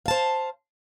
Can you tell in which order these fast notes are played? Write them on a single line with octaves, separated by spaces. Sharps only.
F5 A5 C5